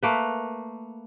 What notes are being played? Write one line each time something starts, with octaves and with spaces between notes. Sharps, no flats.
A3 A#3 B4